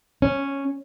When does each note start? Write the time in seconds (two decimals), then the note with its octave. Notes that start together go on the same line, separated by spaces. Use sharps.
0.22 C#4